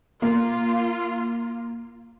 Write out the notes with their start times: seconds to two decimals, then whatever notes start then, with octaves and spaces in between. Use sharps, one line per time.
0.22 A#3 F4